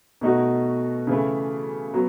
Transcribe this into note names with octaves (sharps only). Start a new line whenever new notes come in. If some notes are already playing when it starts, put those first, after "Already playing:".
B2 A3 D#4 F#4
C#3 E3 A3
F#3 B3